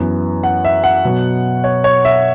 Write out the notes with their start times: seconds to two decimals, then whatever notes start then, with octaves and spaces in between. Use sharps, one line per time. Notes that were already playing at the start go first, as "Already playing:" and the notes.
Already playing: F#2 E3 B3
0.43 F#5
0.65 E5
0.84 F#5
1.04 B2 F#3 B3
1.64 C#5
1.84 C#5
2.05 E5